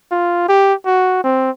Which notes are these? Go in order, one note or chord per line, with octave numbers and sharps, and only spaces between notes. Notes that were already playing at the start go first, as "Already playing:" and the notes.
F4
G4
F#4
C4